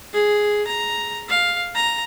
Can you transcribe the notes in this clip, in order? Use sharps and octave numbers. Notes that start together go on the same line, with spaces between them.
G#4
A#5
F5
A#5